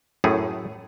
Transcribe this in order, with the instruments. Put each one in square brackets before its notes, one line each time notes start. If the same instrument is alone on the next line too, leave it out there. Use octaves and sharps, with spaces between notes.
[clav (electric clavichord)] F#2 A2 A3 G#4